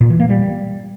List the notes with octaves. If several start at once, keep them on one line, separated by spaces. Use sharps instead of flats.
A#2
E3
A#3
G3